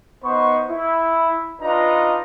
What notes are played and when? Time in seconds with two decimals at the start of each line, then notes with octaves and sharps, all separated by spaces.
0.24 B3 D#4 C5 B5 C#6
0.70 E4
1.61 D4 D#4 F4 B4 A#5